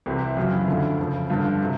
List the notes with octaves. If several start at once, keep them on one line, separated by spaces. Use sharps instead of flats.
C2 C3 E3 G4
F#2 C#3 F#3 F4
E4
D2 D3 F3
F2 C#3 F3
G2 D3 F3 F4
C3